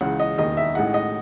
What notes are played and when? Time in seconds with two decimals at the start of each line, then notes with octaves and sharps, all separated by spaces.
0.01 C#2 C#3 E3 F#5
0.20 D#5
0.38 E1 D#2 D#3 D#5
0.57 E5
0.75 A1 A2 G#3 D#4 F#5
0.94 D#5